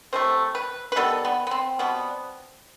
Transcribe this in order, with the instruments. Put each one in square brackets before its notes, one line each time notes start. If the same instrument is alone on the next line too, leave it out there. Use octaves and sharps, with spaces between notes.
[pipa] C3 E3 A3 C5
B4
B4
D#3 G3 B3 A4
B3
B3
C4
B2 G3 B3